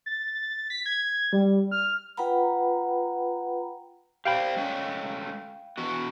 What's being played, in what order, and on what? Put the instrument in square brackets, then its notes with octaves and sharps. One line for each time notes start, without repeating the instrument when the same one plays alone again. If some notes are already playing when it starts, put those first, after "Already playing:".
[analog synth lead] A6
B6
G#6
G3
F6
[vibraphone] F4 B4 F#5 G5 A#5 B5
[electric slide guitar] G4 C5 D5 [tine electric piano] F5 G5 B5
[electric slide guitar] G#3 A3 C#4
E3 B3 F#4